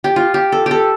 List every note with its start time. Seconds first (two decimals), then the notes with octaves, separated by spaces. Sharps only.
0.04 G4
0.16 F4
0.34 G4
0.52 A4
0.66 G4 A4